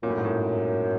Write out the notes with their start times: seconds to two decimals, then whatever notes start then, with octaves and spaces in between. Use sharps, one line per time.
0.03 F#2 A#2
0.10 A2
0.18 G#2
0.25 A2